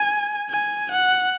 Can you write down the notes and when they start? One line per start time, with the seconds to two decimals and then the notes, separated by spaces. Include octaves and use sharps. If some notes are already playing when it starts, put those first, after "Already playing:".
Already playing: G#5
0.50 G#5
0.92 F#5